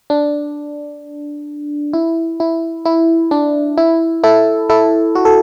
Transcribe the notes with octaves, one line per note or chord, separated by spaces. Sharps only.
D4
E4
E4
E4
D4
E4
E4 A4
E4 A4
F#4
A4